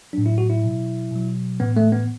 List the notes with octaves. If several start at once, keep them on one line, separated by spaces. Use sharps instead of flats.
A2 F#3 D4
E4
F#4
E4
B2 F#3
B2 F#3
A2 E3 B3
A3
B3